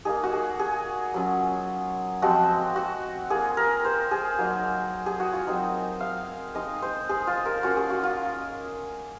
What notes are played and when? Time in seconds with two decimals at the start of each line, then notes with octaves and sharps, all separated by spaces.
0.05 A#3 D#4 G#4
0.24 F#4
0.33 G#4
0.59 G#4
1.14 F#3 C#4 F4
2.22 F3 G#3 C4 F4 F#4
2.76 F#4
3.30 A#3 F4 G#4
3.57 A#4
3.85 C5
4.11 G#4
4.38 F#3 A#3 D#4
5.06 G#4
5.20 F#4
5.33 F4
5.47 F#3 C4 D#4
6.01 F5
6.55 G#3 D#4 D#5
6.82 C5
7.09 G#4
7.27 F4
7.46 A#4
7.63 A#3 C#4 F4 F#4
7.76 G#4
7.90 F#4
8.04 F4